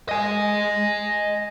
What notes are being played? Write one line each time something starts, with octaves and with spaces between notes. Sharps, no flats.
D#5 G#5